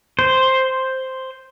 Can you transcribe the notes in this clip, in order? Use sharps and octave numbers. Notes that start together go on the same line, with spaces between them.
C5